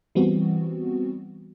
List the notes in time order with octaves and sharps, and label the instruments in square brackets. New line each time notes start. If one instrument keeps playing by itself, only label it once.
[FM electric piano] E3 G3 B3 C4 F#4